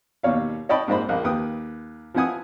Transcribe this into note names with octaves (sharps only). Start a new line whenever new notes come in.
D#2 B2 C#5 F5
D#4 C#5 D#5 G5 A5 B5
A#1 G#2 D#4 C5 B5
A#1 F3 A#3 D#4 F#6
D#2 B4 G5 D#6
F3 C4 E4 F#5 G#5 D#6